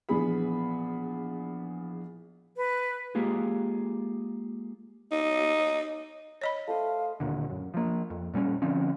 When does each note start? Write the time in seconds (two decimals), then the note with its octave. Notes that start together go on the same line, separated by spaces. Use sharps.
0.09 A#1 E3 B3 G#4 B5
2.57 B4
3.15 G#3 A#3 F4 G4 G#4
5.11 D#4
6.41 C#5 D#5 B5
6.67 A3 C5 F5 D#6
7.20 D#2 A#2 D3
7.50 F#2
7.74 F3 A#3
8.10 F2
8.34 A#2 G3 A3 C#4
8.62 D3 F3 C4 C#4